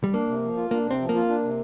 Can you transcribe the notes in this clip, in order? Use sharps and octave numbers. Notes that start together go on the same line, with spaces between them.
G3
A#3 D4
C3
F3
F4
A#3 D4
C3
C4
F3
A#3
F4
D4
C3